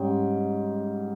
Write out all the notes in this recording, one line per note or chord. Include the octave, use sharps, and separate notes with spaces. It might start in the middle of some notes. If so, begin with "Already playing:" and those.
Already playing: G#2 G3 C#4 G5